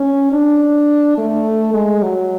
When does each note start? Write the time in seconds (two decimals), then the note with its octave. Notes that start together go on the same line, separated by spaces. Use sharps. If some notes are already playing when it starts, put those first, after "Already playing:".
Already playing: C#4
0.32 D4
1.18 A3
1.74 G#3
2.02 F#3